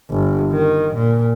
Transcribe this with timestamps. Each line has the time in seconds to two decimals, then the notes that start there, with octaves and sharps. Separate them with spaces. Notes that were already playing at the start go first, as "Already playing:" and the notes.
0.10 G1
0.52 D#3
0.95 A#2